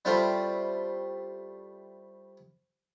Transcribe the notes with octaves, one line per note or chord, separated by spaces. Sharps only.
G3 A3 C4 E4 F4